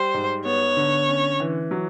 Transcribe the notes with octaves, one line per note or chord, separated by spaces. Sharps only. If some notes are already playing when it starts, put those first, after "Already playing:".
Already playing: G3 C5
G#2
B3 C#5
D3
C#4
E3
F#3